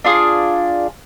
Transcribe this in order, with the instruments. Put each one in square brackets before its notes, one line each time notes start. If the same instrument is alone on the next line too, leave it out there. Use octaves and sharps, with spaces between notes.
[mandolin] D4 F4 G#4 D#6